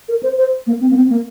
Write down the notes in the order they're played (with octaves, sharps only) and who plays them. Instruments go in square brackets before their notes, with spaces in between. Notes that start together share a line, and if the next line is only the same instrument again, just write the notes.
[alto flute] A#4
C5
C5
A#3
C4
A#3
C4
A#3